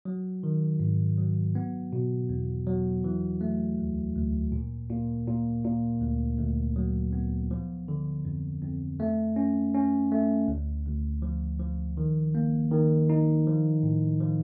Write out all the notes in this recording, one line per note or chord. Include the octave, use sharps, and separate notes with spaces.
F#3
D#3
G#2
F#3
B3
B2
E2
F#3
E3
A3
D2
D2
A#2
A#2
A#2
A#2
D2
D2
F#3
B3
F3
D3
F2
F2
A3
C#4
C#4
A3
D2
D2
F3
F3
D#3
A#3
D#3
D#4
F3
A2
F3